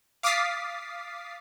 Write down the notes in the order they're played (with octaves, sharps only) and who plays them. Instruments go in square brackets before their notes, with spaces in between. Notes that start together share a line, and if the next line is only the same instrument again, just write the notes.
[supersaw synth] F5 D6 D#6 A6 B6 C7